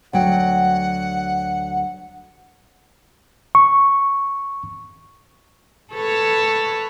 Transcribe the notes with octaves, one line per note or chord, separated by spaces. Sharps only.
D2 F#3 F#5 G5
C#6
A4 B4 C#5